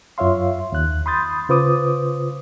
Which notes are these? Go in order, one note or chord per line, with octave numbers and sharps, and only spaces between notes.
F#2 F4 C#5 E5 F5 C6
D#2 F#6
B5 C6 D#6 G6 A6
C#3 F4 B4 C5 D6 D#6